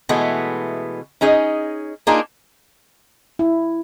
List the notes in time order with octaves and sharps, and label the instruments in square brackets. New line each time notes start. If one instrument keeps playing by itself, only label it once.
[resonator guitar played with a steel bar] B2 E3 G#3 A3 B3
C#4 D#4 G#4 D#5
A#3 D4 D#4 F4 G#4 A#4
[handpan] E4